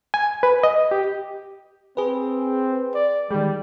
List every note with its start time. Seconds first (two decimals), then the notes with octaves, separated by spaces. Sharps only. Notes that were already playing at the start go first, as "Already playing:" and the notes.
0.14 G#5
0.43 B4
0.63 D#5
0.91 G4
1.97 C4 G#4 B4
2.95 D5
3.31 D#3 G3 G#3